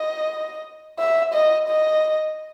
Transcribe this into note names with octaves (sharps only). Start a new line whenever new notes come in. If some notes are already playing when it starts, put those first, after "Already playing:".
Already playing: D#5
E5
D#5
D#5